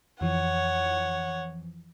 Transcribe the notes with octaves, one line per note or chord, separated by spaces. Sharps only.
F2 E3 F3 C#5 F#5